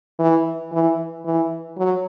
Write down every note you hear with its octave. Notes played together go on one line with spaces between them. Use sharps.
E3
E3
E3
F#3